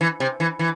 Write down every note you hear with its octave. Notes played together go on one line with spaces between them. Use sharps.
E3
C3
E3
E3